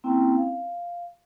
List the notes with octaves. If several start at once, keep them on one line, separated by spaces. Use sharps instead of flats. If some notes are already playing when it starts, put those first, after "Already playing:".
A#3 C4 C#4 E4 G5
F5